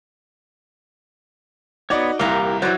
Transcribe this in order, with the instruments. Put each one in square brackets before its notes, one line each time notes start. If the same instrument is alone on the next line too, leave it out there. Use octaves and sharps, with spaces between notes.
[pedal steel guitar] B3 C#5 [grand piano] D#4 F#4 D5
[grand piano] C2 [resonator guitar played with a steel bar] A#2 E3 A#3 [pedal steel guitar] G4 A#4 A#5
[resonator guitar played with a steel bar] E3 F#3 [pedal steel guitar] C5 D5